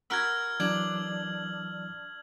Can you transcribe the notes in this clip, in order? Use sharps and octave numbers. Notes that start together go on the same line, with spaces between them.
F#4 A#4 B5 E6 F6 G#6
E3 F#3 D4 G#6 F#7